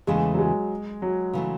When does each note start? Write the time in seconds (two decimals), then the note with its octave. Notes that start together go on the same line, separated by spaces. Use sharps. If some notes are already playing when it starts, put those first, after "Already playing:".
0.07 E2 C#3 E3 G#3 A3
0.33 F#3
0.39 G#3
1.02 F#3
1.33 C#3 E3 A3